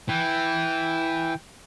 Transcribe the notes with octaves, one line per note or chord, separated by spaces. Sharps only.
E3 G5